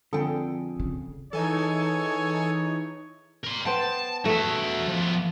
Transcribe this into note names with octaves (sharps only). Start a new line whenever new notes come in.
F2 D3 G#4 A4 G5
C#3
E3 D#4 G#4 A4 C#5 G#5
A#4 C6
B3 C5 G5 A5
A3 F#4 G#4 E5
F3 B3